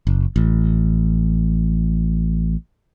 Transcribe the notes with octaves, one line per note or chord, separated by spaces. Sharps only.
F#1
A1